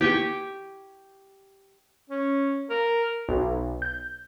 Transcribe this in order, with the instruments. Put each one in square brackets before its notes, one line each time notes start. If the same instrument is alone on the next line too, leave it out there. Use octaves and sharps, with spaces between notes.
[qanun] G4 G5 G#5 C#6
[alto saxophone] C#4
A#4
[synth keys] B1
G6